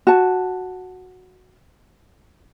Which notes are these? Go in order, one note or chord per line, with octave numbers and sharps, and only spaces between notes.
F#4 A5